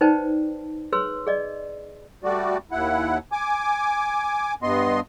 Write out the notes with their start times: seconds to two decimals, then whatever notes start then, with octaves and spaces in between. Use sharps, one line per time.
0.01 D#4 B4 C5 D5 G5 A5
0.92 G#4 B4 C#5 C6 E6
1.27 G#4 D5 D#5
2.24 G3 A3 F#4 D5
2.72 D#2 E4 F#5
3.32 G#5 D6
4.63 G2 B3 D#5 C6